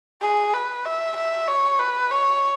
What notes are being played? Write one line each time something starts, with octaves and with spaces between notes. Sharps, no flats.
G#4
B4
E5
E5
C#5
B4
C#5